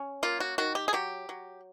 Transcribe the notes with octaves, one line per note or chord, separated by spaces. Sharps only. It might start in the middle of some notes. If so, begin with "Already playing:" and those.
Already playing: C#4
A#3 F4
F#4
D#3 F#4
G4
G#4
F#3 G4
F#3